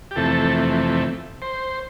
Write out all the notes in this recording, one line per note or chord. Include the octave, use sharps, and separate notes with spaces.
G4
F2 C3 E3 A3 A4
C5